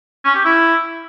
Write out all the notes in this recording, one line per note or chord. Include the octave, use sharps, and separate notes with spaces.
C#4
G4
E4